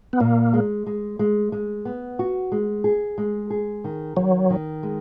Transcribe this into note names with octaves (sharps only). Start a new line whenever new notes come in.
B3
A#2 A#3
G#3
G#3
G#3
G#3
B3
F#4
G#3
G#4
G#3
G#4
D#3
D#3 F#3
D#3
G#3